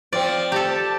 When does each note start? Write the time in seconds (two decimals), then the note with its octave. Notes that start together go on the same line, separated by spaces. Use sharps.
0.13 F3 C4 D5
0.52 G4 A4 A5